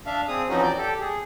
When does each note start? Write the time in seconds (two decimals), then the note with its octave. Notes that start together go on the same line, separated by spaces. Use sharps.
0.06 D4 E5 F5
0.28 C4 G#4 D#6
0.49 E3 F3 C4 C#4 D#4 F#4
0.62 D5 G6
0.78 G4 A4
1.00 G#4